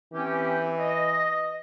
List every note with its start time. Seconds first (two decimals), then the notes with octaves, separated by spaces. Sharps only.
0.13 E3 C4 C#4 G4
0.79 D#5